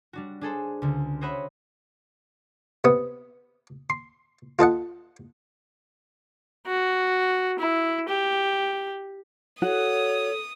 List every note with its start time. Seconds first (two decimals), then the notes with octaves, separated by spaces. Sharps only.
0.13 G3 D4 F#4
0.41 D4 G#4 A4 C5
0.82 C#2 D3
1.21 C5 C#5 D#5 E5 F#5 B5
2.84 C3 B3 D#6
3.90 C6
4.59 F4 A4 D#5 F#5
6.67 F#4
7.59 E4
8.08 G4
9.62 F#4 A4 C#5 F#5 D#6